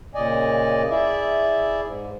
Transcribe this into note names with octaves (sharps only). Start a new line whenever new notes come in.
A#2 C#3 D5 D#5 G#5
E4 G#4 D5 E5
G#2